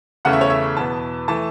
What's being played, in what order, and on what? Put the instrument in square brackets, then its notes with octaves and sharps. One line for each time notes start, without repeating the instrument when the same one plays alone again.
[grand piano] E2 C#3 A3 C#4 F#5
E5
C#5
E5
E2 B2 B3 A5
E3 A3 A5